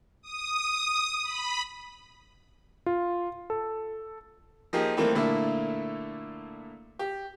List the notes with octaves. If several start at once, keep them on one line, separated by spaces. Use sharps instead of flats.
D#6
B5
F4
A4
F3 A#3 D#4 G4 G#4
D#3 E3 G3 A3 A#3 C4
A#2 D3 A3 A#3 E4
G4